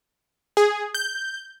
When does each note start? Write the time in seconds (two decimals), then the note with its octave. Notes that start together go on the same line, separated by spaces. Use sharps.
0.57 G#4
0.95 G6